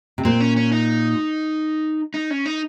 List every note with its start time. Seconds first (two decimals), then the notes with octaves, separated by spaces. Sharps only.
0.18 C3
0.25 A#2 C4
0.40 C#4
0.57 C#4
0.72 D#4
2.14 D#4
2.31 C#4
2.46 D#4